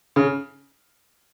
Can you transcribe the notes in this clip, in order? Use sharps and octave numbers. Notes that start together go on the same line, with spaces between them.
C#3